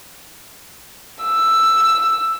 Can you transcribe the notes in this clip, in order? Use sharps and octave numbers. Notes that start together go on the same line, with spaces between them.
E6